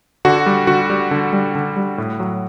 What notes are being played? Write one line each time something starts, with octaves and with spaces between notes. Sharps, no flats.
D3 F#4
G3
D3 F#4
G3
D3
G3
D3
G3
A2
F#3